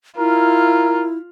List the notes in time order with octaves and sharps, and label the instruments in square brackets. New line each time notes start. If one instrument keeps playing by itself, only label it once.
[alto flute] E4 [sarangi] F4 [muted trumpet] A#4